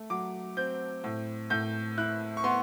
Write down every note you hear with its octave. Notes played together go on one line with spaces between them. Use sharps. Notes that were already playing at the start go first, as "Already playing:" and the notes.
Already playing: A3
F#3 D6
C4 G6
A2
A2 G6
E4 F#6
C#6
B3 C6